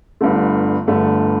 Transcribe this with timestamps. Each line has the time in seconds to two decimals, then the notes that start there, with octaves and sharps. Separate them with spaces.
0.21 G1 G2 D3 A3
0.87 G1 G2 D3 A3